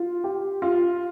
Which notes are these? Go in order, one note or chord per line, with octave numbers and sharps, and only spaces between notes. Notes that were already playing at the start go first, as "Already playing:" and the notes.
Already playing: F4
G4
F4